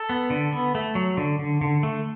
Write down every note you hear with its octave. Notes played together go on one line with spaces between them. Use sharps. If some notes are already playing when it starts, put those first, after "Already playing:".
Already playing: A4
B3
D3
B3
A3
F#3
D3
D3
D3
A3